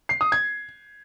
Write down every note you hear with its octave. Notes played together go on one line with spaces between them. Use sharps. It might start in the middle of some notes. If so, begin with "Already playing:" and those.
C7
D#6
G#6